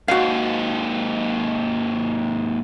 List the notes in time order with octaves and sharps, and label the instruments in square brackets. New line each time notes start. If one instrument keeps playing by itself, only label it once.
[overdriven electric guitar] D#2 G#2 [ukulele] F#4 F5